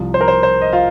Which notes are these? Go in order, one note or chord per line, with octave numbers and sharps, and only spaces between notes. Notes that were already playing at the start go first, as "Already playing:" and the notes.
Already playing: C2 C3 F3
C5
A#4
C5
C5
D#5
F4 F5